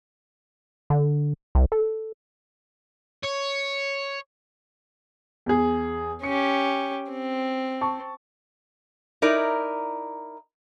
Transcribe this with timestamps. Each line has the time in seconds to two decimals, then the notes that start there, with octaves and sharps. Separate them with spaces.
0.90 D3
1.55 C2
1.72 A4
3.24 C#5
5.46 E2 G#4
6.23 C#4 G4 C#7
7.11 C4
7.81 A5 C#6
9.22 D#4 E4 A#4 D5